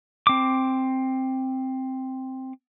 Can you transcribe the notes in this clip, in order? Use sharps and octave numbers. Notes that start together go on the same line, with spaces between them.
C4 D6